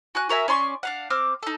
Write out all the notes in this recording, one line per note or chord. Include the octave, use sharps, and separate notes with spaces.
F#4 G#5 F#6
F#4 A#4 E5 G#5
C#4 D5 C6 C#6
D4 F5 F#5
C4 D6 F6
D#4 A4